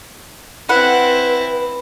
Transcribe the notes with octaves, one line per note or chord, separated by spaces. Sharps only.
C4 E4 B4 F#5 B5